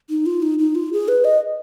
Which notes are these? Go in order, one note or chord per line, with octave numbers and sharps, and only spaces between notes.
D#4
F4
D#4
D#4
F4
G#4
B4
D#5